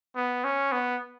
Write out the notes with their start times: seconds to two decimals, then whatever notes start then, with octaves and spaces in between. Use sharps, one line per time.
0.16 B3
0.44 C#4
0.72 B3